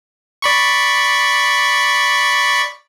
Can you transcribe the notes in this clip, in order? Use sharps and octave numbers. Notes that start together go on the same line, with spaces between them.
D5 B5 C#6